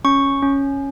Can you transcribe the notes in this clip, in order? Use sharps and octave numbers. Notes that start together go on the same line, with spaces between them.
C#4 C#6
C#4